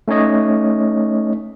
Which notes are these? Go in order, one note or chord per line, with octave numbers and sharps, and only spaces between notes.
A3 C#4 D#4 C#5 D#5